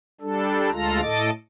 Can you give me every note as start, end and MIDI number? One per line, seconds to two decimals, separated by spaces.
0.21 0.71 55
0.21 0.71 62
0.21 0.71 69
0.71 1.01 38
0.71 1.01 56
0.71 1.01 65
0.71 1.01 69
0.71 1.01 82
1.01 1.30 45
1.01 1.30 69
1.01 1.30 75
1.01 1.30 86
1.01 1.30 93